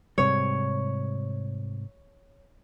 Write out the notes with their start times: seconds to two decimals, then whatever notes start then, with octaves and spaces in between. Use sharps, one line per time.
0.18 G#2 C3 G3 C#5